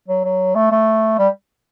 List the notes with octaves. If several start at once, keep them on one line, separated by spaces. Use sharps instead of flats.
F#3
F#3
A3
A3
G3